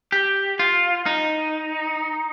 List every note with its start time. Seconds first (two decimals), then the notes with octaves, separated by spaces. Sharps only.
0.12 G4
0.59 F4
1.06 D#4